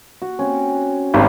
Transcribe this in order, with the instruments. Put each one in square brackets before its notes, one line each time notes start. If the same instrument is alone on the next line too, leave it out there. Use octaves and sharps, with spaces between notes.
[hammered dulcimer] F#4
C4 C#4
[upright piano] G#1 [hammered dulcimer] G3 A#3 C5